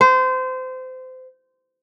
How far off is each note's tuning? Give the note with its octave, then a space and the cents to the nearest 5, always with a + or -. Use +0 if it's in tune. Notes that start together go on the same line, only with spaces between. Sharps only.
C5 -25